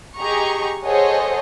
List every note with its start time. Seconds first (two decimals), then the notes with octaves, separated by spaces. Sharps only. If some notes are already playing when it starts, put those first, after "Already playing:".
0.19 G4 G#4 D#5 A#5 C#6
0.85 G#4 A4 C5 C#5 D#5 F#5